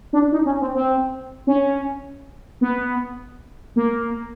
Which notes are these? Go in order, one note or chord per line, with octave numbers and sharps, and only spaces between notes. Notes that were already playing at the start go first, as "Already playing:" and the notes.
D4
D#4
C#4
C4
C4
C#4
B3
A#3